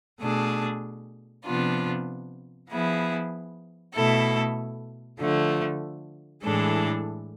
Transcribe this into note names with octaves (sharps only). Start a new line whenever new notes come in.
B2 A3 D4 G#4
C3 F3 B3 D4 F4
F3 B3 E4 G#4
B2 A3 E4 A4
D3 F3 A3
A2 E3 G#3 D4 A4